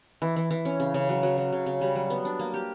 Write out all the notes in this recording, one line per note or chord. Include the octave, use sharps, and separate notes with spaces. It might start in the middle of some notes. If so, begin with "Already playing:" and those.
E3
E3
E3
C#4
C#3
C#3
F#3
F#3
F#3
C#3
C#3
G3
F#3
B3
D4
A#3
G4